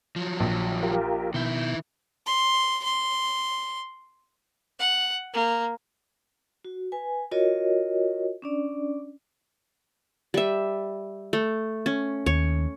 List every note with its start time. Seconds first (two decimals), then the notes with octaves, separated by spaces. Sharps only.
0.16 F3 F#3
0.40 A#1
0.83 F4 G4 A#4
1.34 B2 D#3 E4 G6
2.26 C6
2.84 C6
4.79 F#5
5.33 A#3
6.65 F#4
6.92 B4 G#5
7.31 F4 F#4 A#4 C#5 D#5
8.42 C#4 D4 D5
10.34 G3 E5
11.33 A3
11.86 C#4
12.26 D#2 C#5